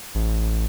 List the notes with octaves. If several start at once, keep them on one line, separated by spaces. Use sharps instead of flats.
A1